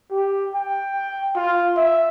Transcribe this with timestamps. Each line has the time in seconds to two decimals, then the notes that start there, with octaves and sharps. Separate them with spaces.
0.11 G4
0.55 G5
1.36 F4
1.77 E5